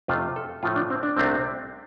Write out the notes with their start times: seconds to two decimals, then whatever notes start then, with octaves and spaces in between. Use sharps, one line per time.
0.08 F2 C3 A3 F4
0.36 A4
0.63 A2 F3 A3 F4
0.76 D4
0.90 C4
1.03 D4
1.16 C2 C3 A3 C4